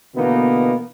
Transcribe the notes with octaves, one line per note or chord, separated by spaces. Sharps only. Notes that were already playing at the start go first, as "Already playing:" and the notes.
B2 D3 E3 A#3 B3 D#4